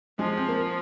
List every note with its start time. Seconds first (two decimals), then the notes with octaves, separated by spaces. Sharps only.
0.19 F3 G#3
0.37 C4
0.48 A#3